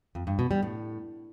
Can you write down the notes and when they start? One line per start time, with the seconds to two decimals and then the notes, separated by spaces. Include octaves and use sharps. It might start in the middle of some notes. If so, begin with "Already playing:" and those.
0.15 F2
0.27 G2
0.39 B2
0.51 G3
0.63 A2